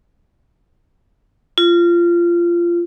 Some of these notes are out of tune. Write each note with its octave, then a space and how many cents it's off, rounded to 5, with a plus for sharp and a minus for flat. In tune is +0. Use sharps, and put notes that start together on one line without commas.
F4 -20